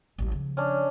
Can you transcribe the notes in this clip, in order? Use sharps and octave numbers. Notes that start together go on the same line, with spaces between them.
A1 F#3
C#3 F3
C#4 D4